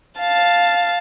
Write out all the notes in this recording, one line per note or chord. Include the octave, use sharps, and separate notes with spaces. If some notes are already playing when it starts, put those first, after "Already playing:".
F5 A5